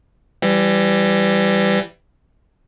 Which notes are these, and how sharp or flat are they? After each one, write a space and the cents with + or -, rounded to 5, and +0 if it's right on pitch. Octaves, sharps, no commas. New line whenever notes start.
E3 +25 G3 +0